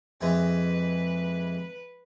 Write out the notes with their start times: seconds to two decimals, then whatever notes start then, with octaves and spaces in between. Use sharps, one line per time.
0.21 F2 E3 G#3 B4